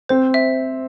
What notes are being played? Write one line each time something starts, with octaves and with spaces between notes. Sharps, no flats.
C4 C5
E5